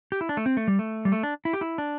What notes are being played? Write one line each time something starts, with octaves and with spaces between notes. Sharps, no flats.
G4
E4
D4
A3
C4
A3
G3
A3
G3
A3
D4
E4
G4
E4
D4